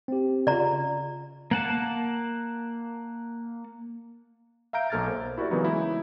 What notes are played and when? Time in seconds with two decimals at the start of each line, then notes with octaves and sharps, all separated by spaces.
0.08 C4 G4
0.47 C#3 F4 D5 A#5
1.51 A#3 F#5 A5
4.73 E5 F5 A#5 G6 D7
4.90 B1 A#3 A4 F6 G#6 A6
5.08 A#4 C5
5.38 E4 F#4 G4 A#4 D5
5.51 C#3 E3 F#3 A#3 B3 D#4
5.65 G#3 E4